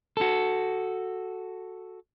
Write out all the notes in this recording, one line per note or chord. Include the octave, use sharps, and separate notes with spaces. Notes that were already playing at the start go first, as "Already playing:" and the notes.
F#4 A4